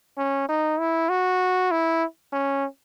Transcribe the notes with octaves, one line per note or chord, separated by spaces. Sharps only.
C#4
D#4
E4
F#4
E4
C#4